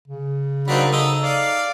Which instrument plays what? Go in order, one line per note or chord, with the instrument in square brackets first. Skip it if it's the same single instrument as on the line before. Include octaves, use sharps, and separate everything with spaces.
[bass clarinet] C#3
[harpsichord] F#3 A#3 C4 [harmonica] D4 D#4 B5
[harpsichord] D#4 A4 [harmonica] D#6 E6
[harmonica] D5 F5